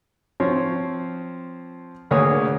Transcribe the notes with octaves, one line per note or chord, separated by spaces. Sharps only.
F3 C4 C#5
D2 A#3 G#4 B4 C#5 D#6